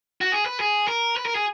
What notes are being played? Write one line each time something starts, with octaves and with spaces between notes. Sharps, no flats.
F#4
G#4
B4
G#4
A#4
B4
A#4
G#4